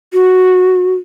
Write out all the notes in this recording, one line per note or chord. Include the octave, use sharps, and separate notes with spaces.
F#4